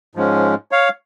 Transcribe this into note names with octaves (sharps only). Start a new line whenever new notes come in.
G#2 F3 G#3 C#4
C#5 F5